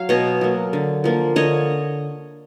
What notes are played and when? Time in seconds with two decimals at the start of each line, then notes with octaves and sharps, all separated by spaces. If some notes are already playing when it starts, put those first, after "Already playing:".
Already playing: F#3 F5
0.09 B2 C#5 D#5
0.41 F#3 A#3
0.73 D3
1.04 F3 A#3
1.36 D3 C#5 D#5